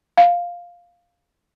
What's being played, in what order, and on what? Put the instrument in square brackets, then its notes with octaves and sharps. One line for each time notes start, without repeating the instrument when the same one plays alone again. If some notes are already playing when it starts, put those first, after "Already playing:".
[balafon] F5